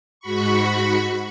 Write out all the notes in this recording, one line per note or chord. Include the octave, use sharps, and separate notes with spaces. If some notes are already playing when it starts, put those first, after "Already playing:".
G#2 F#4 B5 C#6